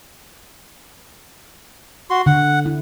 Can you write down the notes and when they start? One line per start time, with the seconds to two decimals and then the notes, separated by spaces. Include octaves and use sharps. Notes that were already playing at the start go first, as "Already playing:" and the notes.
2.10 F#4 C6
2.26 D3 F#5
2.66 E4